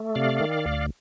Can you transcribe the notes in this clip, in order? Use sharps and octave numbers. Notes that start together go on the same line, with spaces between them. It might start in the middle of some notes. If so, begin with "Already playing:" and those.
Already playing: A3
C3 D5 F5
D#3
D2